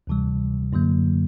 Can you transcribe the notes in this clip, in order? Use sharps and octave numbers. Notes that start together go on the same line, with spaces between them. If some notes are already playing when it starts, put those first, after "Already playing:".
D2 C3 E3 G3
F#2 D3 F#3 A#3